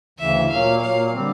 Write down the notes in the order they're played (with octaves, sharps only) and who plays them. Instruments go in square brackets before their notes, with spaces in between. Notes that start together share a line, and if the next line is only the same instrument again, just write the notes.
[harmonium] D2 C#3 E3 [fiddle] E5
[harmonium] A#2 F#3 A#3 [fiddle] F5
[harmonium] A#2 F#3 A#3 [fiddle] F5
[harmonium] D3 G3 C4